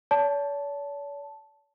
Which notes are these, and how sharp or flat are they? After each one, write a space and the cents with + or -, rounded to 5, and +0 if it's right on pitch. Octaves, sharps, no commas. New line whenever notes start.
C#5 +45 A5 -5